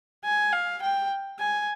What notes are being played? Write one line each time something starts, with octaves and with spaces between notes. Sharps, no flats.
G#5
F5
G5
G#5